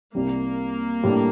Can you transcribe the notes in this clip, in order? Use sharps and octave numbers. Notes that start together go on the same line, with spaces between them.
C2 C3 G3 A#3
A2 G3 D4 G4